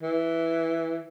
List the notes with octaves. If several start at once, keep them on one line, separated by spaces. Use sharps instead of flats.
E3